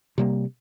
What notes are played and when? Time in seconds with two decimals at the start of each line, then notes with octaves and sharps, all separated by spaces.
0.18 C3 G3 A#3